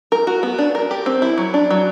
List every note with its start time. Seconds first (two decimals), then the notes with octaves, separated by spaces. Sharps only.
0.12 A#4
0.27 F#4
0.43 B3
0.58 D4
0.75 A#4
0.91 G4
1.06 C4
1.22 E4
1.38 F#3
1.54 D4
1.71 F#3